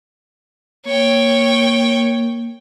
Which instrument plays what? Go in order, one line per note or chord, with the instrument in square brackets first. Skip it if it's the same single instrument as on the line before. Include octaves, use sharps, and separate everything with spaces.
[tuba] A#3 [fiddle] C#5 G5